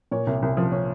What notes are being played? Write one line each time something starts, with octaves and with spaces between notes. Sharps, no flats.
A#2 C#5
C2
C2
F3
C#5